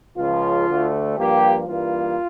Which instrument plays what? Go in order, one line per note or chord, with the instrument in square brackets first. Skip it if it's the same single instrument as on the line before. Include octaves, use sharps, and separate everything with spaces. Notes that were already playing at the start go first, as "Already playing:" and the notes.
[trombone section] C#2 C#3 F3 F4
D2 D3 A3
G2 F3 A#3 G4
G2 E3 G3 A#3 F4